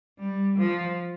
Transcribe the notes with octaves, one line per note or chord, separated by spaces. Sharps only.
G3
F3